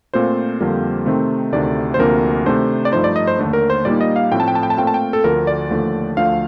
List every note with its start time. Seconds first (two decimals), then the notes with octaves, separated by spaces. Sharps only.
0.14 A#2 A3 C4 F4 C5
0.60 F2 D3 G3 A#3 F4
1.06 C3 D#3 A3 C4
1.52 D2 C3 D#3 A3 D4 D5
1.94 C5
1.99 D2 C3 F3 A#3 D4 A#4
2.46 C3 D#3 A3 D4 C5
2.85 D5
2.92 G2 F3 A3 D#4 C5
3.04 D5
3.16 D#5
3.27 C5
3.39 D#2 D3 A3 D4
3.53 A#4
3.70 C5
3.85 A#2 G3 A#3 D#4 D5
4.01 D#5
4.16 F5
4.32 A2 F3 A3 C4 G5
4.40 A5
4.48 G5
4.55 A5
4.63 G5
4.70 A5
4.77 A#2 A3 C4 F4 G5
4.87 A5
4.94 G5
5.13 A4
5.24 D2 D3 F3 A#4
5.47 D5
5.70 D#2 D3 F3 A3
6.17 D2 D3 F3 A3 F5